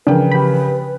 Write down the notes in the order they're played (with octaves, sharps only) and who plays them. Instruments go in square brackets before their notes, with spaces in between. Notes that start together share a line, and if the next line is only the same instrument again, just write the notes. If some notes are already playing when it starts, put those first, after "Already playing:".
[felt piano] C#3 G5 [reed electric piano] E3 F3 A#4 [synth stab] D4 [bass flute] B4
[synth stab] G4 B5